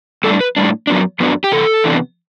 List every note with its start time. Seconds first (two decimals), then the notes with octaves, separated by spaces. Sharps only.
0.24 A2 G3 D4 A4
0.41 B4
0.57 A2 G3 D4
0.87 F#2 F#3 B3 D4
1.20 F#2 F#3 B3 D4
1.44 G4
1.52 E2 C3 A4
1.84 E2 C3 E3 B3 D4